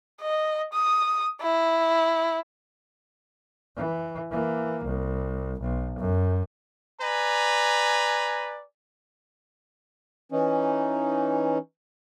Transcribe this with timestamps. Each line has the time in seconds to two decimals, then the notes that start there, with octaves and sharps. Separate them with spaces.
0.22 D#5
0.73 D#6
1.42 E4
3.77 E3
4.31 E3 A#3
4.85 C2
5.61 B1
5.99 F#2
7.01 B4 D5 G#5 A#5
10.32 E3 C#4 D#4